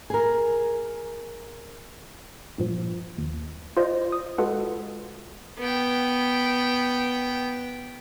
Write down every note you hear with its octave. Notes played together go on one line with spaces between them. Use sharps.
G#4 A#4
G2 A#2 F3
D#2
F4 C5 D5 D#5
D#6
G#3 F4 F#4 A4 B4 F#5
B3 G5